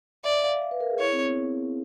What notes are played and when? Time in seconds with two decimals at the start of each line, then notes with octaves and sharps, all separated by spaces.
0.24 D5 E5
0.43 F5
0.62 F5
0.71 B4
0.80 A#4
0.90 G#4
0.99 E4 C#5
1.12 C4
1.25 B3